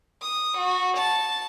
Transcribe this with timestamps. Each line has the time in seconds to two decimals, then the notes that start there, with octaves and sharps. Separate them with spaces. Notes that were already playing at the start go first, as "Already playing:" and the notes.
0.22 D#6
0.57 F#4
0.97 A5